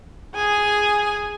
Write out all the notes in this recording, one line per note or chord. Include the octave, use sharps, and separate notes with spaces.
G#4 G#5